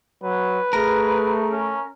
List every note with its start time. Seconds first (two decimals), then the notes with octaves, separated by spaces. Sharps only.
0.23 F#3 B4
0.73 A3 G#4 A#4
1.52 C#4